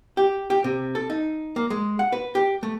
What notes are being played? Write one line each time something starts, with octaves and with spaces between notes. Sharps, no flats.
G4
G4
C3
A4
D#4
A#3
G#3
F#5
B4
G4
A3